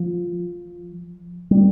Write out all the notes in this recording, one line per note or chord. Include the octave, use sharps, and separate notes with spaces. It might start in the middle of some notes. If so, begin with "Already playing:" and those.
Already playing: F3
G3